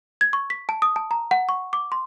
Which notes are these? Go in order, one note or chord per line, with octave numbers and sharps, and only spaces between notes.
G#6
C#6
B6
A5
D#6
A5
A#5
F#5
C#6
D6
C6